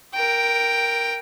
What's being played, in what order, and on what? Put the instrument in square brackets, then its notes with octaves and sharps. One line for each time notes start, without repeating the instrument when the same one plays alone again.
[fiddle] A#4 G5